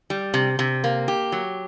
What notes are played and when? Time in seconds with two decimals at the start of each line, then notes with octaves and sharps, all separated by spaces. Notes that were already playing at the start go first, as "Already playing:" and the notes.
0.10 G3
0.34 C3
0.59 C3
0.84 A#3
1.08 G4
1.32 F#3